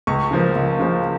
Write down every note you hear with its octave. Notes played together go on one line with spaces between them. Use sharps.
C#2 C#6
C#3 F3 A#3
C#2
C#3 F3 A#3